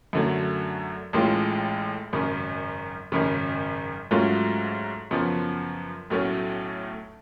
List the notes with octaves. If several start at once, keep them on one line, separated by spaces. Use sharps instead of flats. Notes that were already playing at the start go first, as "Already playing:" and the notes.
F#2 D3 F#3 A3
A1 A2 G#3 C#4 F4
G#1 F#2 C#3
G#1 F#2 C#3
G#2 F#3 A3 C#4 F4
F#2 C#3 F3 B3
B1 A2 F#3 A3 C#4